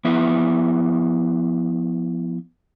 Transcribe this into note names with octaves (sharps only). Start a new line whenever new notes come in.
F3 B3 E4 E5